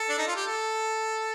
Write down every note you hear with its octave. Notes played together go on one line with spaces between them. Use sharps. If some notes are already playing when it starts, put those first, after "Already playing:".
Already playing: A4
D4
D#4
F4
G4
A4